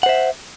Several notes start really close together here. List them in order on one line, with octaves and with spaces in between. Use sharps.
F#5 C5 E5